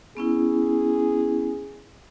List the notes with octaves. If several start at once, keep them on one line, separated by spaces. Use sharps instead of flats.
B3 C#4 E4 G#4